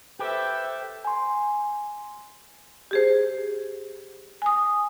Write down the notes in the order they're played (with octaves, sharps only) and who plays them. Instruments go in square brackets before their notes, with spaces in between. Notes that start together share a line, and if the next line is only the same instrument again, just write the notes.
[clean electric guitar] G4 [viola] A4 E5 [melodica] B4 G5 [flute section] C5 G6
[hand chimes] G#5 C6
[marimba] G4 G#4 C5
G#5 D#6